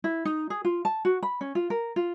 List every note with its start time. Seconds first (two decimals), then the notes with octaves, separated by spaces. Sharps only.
0.04 E4
0.25 D#4
0.50 G#4
0.65 F4
0.85 A5
1.05 F#4
1.23 B5
1.41 C#4
1.55 F4
1.70 A#4
1.96 F4